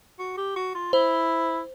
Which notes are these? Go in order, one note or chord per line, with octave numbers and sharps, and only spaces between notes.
F#4
G4
F#4
F4
E4 C5